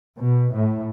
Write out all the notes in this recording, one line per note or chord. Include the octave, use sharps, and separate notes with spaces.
B2
A2